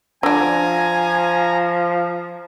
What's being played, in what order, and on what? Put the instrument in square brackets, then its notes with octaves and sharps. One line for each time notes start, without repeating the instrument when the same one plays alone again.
[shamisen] D3 D4 [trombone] F3 [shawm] G#5 [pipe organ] A#5